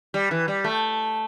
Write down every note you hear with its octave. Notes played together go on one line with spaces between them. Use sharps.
G3
E3
G3
A3